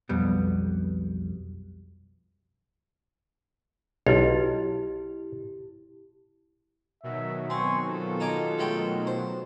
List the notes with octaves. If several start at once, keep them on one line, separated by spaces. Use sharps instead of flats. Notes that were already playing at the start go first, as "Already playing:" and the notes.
B1 F2 G3 B3
B1 E4 G4
B2 D#3 F#3 E5
C4 G#5 C6 C#6
F4 A4
D#4 G#5 D6
G#3 A3 G5
C5